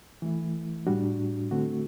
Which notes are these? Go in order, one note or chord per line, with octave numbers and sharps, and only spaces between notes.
E3 A3 E4
A2 G3 D4 F#4
D3 A3 C4 F#4